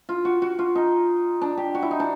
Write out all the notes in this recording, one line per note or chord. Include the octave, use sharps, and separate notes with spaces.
F4
F#4
F#4
F4
D#4
D4
G4
F#4
E4
D#4
D4